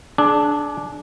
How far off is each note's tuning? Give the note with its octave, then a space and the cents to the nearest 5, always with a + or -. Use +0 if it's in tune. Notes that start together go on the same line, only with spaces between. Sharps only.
D4 +0 G#4 +35